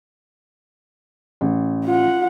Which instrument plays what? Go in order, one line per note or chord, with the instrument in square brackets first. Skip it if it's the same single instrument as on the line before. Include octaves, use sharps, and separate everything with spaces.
[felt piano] A1
[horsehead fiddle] F4 F#5